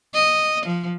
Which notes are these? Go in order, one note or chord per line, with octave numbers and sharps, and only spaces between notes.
D#5
F3